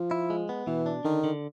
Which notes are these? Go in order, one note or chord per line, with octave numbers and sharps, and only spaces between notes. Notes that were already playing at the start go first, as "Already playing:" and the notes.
Already playing: F3
E4
G#3
B3
B2 E3
D4
D3 D#3
D3